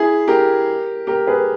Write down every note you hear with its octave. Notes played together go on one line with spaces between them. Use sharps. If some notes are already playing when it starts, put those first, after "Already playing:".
Already playing: E4 G#4
G4 A#4
G4 A#4
G#4 B4